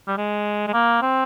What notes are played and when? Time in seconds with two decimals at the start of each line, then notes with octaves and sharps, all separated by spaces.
0.07 G3
0.17 G#3
0.67 G#3
0.73 A#3
1.02 C4